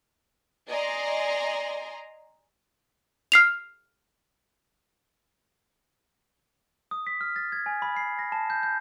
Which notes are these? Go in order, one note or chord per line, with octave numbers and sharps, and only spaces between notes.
D5 D#5 G#5 A#5 C6
F6 C7 F7
D#6
B6
F6
A6
G#6
G#5
B5
C7
A#6
A5
G6
G6